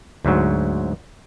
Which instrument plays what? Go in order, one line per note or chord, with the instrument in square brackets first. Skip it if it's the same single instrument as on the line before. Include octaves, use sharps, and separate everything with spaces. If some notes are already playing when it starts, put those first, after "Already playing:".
[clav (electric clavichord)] D2 G#2 F#3